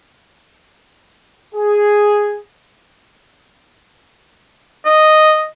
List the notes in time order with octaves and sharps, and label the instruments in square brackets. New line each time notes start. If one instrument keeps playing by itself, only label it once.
[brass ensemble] G#4
[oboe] D#5